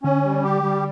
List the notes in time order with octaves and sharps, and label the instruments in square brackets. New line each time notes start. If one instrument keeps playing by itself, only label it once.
[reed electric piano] D3 [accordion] C#4
[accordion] G3
G4
G3